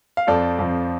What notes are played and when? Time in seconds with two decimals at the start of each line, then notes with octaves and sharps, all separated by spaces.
0.17 F5
0.27 F2 F3 C4 F4 A4 D5
0.59 F2 F3 C4 F4